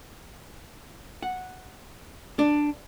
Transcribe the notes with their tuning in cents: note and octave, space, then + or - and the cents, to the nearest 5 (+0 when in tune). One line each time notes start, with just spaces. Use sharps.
F#5 -5
D4 +5